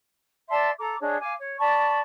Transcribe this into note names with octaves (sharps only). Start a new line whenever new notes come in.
D5 E5 A5 C6
A4 A#5 D6
D4 G#4 C#5 D#5
F5 G#5 D6
C#5
D5 A5 B5 C#6